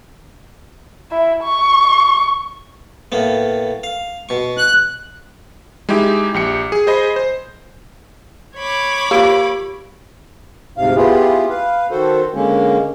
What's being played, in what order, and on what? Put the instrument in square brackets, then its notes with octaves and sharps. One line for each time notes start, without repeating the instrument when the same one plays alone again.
[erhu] E4
C#6
[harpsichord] A2 A#3 B3
F5
B2 C#6
[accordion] F#6
[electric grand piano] G#3 D#4 E4 G4
A#1 G4 C#7
G#4
G#4 C5 D#5 B5
C5
[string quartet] C#5 B5 D6
[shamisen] F3 A#3 [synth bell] G4
[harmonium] D2 G#2 C3 F5
B3 E4 F4 G4 G#4
B4 F5
D#3 F#4 A4 C5
D3 G#3 A#3 C#4